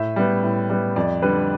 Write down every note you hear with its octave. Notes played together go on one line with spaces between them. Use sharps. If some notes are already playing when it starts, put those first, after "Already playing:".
Already playing: A2 E5
G3 B3
A2
G3 B3
F2 D5
D3 G3 B4